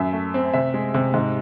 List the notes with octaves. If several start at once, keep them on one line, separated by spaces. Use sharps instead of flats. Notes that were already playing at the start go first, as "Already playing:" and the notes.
Already playing: F#2 E5
A3
C4
C3 E5
G#3
C3
G#2